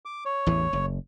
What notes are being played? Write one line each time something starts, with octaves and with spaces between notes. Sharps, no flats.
D6
C#5
A1 E2 E3
F#1